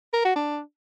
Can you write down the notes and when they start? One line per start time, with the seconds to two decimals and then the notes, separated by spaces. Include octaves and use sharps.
0.14 A#4
0.25 F#4
0.36 D4